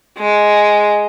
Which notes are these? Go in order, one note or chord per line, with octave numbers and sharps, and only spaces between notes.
G#3